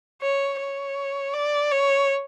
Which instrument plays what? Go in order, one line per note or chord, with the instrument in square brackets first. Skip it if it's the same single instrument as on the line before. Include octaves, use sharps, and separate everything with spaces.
[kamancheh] C#5
C#5
D5
C#5